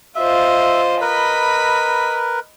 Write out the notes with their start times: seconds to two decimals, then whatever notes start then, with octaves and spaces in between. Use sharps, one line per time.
0.15 F4 C5 D#5 E5
1.01 A#4 B4 D#5 B5